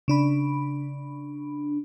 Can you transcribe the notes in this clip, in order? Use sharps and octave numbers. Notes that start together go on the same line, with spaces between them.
C#3 D4 B5